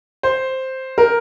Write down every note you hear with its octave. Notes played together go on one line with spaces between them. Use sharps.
C5
A#4